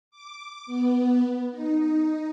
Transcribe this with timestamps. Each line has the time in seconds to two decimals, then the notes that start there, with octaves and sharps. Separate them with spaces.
0.11 D6
0.66 B3
1.52 D#4